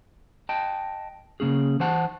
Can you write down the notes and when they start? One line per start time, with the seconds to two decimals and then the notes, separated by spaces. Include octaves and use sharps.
0.49 D#5 G5 A5
1.40 C#3 A#3 C#4 G#4
1.80 E3 C5 F#5 A5